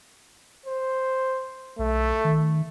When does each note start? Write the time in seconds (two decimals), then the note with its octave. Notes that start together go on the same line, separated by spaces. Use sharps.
0.66 C5
1.79 B1 A3
2.25 D#3